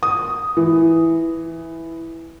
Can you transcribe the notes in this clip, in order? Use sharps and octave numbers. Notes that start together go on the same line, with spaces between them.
D#6
E3